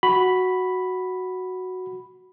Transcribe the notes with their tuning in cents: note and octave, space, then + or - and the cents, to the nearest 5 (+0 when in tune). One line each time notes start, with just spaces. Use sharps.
F#4 +0 B5 +0